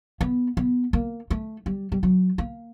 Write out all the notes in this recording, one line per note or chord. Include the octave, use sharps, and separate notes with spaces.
B3
B3
A#3
A3
G3
G3
F#3
A#3